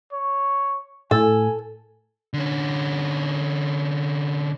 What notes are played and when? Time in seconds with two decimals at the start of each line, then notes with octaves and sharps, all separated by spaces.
0.13 C#5
1.11 A2 A4 G#5
2.34 D3 C#4